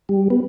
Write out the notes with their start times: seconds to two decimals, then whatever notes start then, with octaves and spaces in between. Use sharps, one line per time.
0.09 G3
0.30 B3